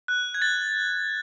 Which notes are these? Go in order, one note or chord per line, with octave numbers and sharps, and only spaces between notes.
F#6
G#6
A6